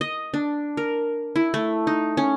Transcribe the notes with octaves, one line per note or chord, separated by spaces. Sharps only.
D#5
D4
A#4
E4
A3
D#4
C#4